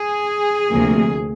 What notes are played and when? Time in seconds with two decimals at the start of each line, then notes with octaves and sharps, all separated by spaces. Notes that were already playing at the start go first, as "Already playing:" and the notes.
Already playing: G#4
0.69 D2 C3 F3 A#3